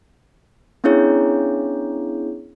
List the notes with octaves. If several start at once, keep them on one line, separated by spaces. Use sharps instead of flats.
B3 C#4 D4 E4 G#4 C#5